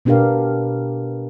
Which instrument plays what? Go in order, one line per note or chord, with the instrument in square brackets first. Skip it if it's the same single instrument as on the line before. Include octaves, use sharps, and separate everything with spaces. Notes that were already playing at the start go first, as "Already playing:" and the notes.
[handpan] B2 B3 D4 G4 A#4 F5